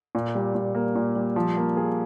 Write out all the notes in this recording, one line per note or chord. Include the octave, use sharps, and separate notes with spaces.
A#2
G3
A#2
A#3
A#2
G3
F3
A#3
G#4